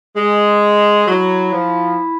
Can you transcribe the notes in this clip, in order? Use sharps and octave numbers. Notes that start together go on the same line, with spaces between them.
G#3
F#3 E4
F3